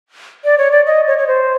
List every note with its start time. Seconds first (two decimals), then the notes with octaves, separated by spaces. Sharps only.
0.44 D5
0.58 C#5
0.71 D5
0.86 D#5
1.07 C#5
1.18 C#5
1.27 C5